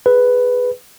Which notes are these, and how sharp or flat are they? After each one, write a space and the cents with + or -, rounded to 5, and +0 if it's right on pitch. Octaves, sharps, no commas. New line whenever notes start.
G#4 +0 B4 +5